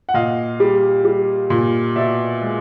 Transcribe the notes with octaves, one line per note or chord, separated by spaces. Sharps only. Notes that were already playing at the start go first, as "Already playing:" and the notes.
F#5
A#2 D#5 F5
G3
G3
A#2
B2 D5 E5
G#3